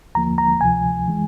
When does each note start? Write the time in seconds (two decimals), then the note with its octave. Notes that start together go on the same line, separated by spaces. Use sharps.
0.15 D#2 D3 F3 A#3 A#5
0.38 A#5
0.61 D2 C3 F3 G#5
1.08 E3 G#3